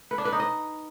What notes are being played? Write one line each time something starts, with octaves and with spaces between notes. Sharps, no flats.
B4
D4
B4
D#4
D#5